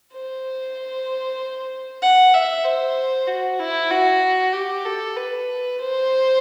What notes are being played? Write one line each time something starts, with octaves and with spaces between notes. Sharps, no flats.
C5
F#5
E5
C5
F#4
E4
F#4
G4
A4
B4
C5